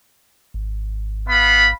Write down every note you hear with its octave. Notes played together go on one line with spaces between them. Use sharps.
G#1
B3 F5 B5